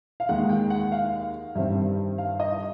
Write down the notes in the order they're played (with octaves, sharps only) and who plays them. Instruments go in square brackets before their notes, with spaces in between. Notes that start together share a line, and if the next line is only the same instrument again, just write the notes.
[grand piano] F5
D#2 D#3 G#3 F#5
G5
F#5
F5
G2 D#3 G3 C4 E5
F5
D#5